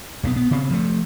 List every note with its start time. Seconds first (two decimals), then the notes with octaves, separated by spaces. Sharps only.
0.23 B1 F#3 B3
0.36 B3
0.51 C#3 C4
0.71 F3 A3